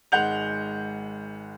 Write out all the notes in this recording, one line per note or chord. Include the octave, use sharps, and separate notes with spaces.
G#1 G#3 F#5 G6 F7